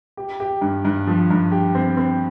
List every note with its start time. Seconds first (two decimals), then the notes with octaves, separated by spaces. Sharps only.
0.17 G4
0.40 G4
0.61 G2
0.85 G2
1.07 F3
1.30 G2
1.52 G4
1.75 C4
1.97 C4